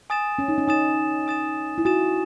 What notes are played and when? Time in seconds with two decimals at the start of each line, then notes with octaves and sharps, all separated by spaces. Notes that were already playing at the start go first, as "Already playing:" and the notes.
0.10 G#5 D#6 A6 E7
0.39 C#4
0.48 D#4
0.58 C#4
0.68 D#4 G#5 D#6 A6 E7
1.27 G#5 D#6 A6 E7
1.78 E4
1.85 F#4 G#5 D#6 A6 E7